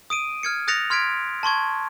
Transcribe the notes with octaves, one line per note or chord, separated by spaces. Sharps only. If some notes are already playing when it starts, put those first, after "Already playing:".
D#6 D7 D#7
F6 G#6 C#7
D#6 F#6 A6 A#6 C#7 F7
C6 F6 G#6 B6 D7
A5 C6 C#6 G#6